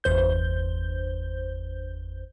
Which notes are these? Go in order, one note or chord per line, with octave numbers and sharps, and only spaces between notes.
G1 E2 C5 G6